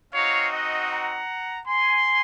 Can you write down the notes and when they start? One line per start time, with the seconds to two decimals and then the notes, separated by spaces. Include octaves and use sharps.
0.13 C4 D#4 F#4 C#5 F5
0.52 D#5 F#5
0.91 F#5 A#5
1.68 G#5 C6